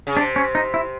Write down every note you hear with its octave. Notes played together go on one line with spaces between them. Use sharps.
C#3
C3 D4
C#4
D#4
E4